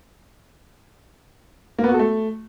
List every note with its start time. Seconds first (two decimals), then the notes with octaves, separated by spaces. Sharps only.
1.79 A#3
1.84 B3
1.89 F#4
1.94 A4
1.99 A3